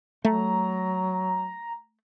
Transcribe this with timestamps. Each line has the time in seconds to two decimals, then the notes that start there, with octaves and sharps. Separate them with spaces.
0.25 F#3 A3 A#5